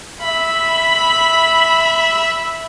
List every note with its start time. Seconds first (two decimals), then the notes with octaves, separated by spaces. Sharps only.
0.22 E5 B5